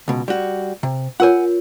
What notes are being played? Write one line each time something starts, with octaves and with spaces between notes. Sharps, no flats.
C#2 B2
G3 F#4
C3
F4 A#4 C#5 F#5 G#5